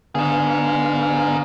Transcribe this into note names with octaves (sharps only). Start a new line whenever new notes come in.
D3 B3 D#4 G#4 F5